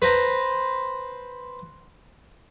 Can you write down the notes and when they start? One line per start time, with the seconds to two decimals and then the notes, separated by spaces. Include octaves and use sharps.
0.02 B4 C5 A#5